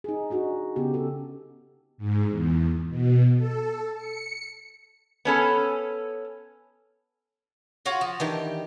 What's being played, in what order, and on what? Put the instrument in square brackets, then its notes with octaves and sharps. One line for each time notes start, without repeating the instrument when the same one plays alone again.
[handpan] D#4 G#4
D4 D#4 F#4
C#3 B3 G4
C#3 G4 A4
[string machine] G#2
E2
B2
A4
C#7
[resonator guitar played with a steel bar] B3 C#4 A4
[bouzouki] F4 F#4 C#5
F3
[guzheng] D#3 E3 D4 [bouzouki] G4